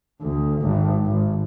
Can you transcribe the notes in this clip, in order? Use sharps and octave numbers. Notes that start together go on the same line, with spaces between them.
D2
G#1
G#1